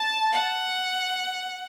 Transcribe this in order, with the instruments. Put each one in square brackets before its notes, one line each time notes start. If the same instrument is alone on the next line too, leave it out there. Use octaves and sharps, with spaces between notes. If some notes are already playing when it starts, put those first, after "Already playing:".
Already playing: [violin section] A5
[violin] F#5